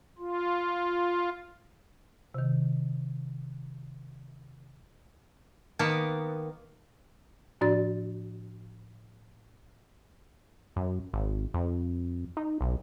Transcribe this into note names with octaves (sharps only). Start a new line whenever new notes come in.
F4
C3 D#3
D#3 A#3 B3
A2 F3 D4 F#4 D5 A6
F#2
G#1
F2
D#4
B1